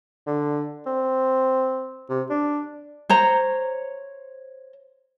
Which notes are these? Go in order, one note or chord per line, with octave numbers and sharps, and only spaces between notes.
D3
C4
C3
D4
C5 C#5 A#5